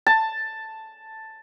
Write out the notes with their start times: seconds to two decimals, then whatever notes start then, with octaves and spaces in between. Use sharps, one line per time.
0.07 A5